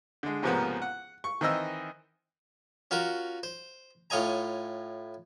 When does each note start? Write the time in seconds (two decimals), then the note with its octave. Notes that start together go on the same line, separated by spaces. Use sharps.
0.23 D3 G#3
0.43 C#2 G#2 C3 F3 A#3 B3
0.82 F#5
1.24 C#6
1.41 D#3 E3 C4 D#5 E6
2.91 C#4 F4 F#4 A#4
3.43 C5
4.10 A2 F4 C#5 D#5 G#5 A#5